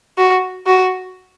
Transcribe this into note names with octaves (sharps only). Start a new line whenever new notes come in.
F#4
F#4